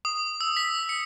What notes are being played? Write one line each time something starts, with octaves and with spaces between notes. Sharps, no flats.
D#6
E6
B6
C#7